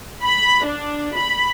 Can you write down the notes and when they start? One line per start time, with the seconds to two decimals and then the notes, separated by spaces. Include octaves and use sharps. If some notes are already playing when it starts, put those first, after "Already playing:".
0.23 B5
0.66 D4
1.17 B5